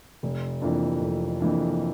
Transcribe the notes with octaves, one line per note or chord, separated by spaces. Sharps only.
F1
F2 E3 A#3 D4
F1
F2 E3 A#3 D4